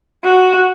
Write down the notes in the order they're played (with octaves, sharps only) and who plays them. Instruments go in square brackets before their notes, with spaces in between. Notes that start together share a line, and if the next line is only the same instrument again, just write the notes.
[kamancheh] F#4